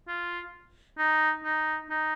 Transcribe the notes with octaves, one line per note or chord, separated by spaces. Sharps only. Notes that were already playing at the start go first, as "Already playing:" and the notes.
F4
D#4
D#4
D#4